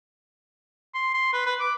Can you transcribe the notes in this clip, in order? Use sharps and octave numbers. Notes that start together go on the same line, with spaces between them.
C6
C6
B4
B4
D6